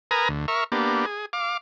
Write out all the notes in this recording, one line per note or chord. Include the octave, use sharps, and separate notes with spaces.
A#4 B4 G#5 A#5 D#6
D2
A#4 E5 C#6 F6
A#3 B3 D4 G4
G#4
F5 D6